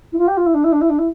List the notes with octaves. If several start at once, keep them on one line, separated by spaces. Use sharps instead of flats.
E4
F4
G4
F4
E4
D4
E4
D4
E4
D4
E4